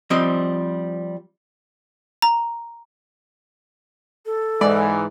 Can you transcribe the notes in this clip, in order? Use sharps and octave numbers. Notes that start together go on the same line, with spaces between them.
F3 G3 C4 D#5
A#5
A4
G#2 E3 G#3 D5